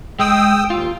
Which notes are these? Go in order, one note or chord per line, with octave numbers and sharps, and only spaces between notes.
G#3 G5 D#6 E6
D#2 F4